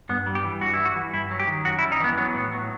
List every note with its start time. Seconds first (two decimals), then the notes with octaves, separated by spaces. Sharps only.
0.09 G2 B3
0.26 G3
0.35 G4
0.44 E3
0.61 G2 F#4
0.74 G3 E4
0.85 F#4
0.96 E3
1.13 G2 E4
1.31 F#3
1.40 G4
1.47 D#3
1.65 F#2 F#4
1.79 E4
1.83 G3
1.92 D#4
2.00 E3 B3
2.17 F#3 B3
2.35 A2
2.53 F#3